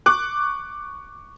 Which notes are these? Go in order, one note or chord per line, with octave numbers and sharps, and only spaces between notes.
C#6 D6 F#6